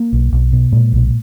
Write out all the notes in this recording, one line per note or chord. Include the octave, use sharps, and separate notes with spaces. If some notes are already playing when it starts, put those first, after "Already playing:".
Already playing: A#3
B1
B1
B2
A#2 G#3
B1